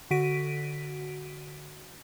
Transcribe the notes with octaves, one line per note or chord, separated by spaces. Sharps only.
D3 F#4 B6 D7 D#7